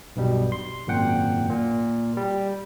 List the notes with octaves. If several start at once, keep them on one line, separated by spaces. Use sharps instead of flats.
B1 G2 B2 G3
C6
G#1 F#2 A#2 F#5 G5
A#2
G3